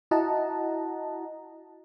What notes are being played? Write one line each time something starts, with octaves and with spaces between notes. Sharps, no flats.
E4 F#4 D#5 F#5 A5 A#5